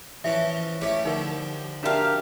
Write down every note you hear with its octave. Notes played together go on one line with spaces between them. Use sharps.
E3 F3 C#4 E5
A3 C#4 E4 G4
D3 F3 D#4 A#4
D4 F#4 G4 A#4 E5 F5 A5